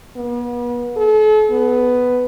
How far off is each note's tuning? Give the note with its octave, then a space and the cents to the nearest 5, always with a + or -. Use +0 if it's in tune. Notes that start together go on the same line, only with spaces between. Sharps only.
B3 -35
A4 -40
B3 +10